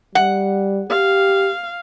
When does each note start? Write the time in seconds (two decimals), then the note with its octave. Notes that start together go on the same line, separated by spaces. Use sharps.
0.15 G3 F#5
0.90 G4 F5